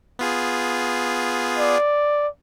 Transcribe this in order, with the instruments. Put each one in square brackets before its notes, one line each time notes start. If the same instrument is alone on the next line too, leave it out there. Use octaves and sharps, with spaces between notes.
[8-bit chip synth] B3 F4 G#4
[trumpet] D5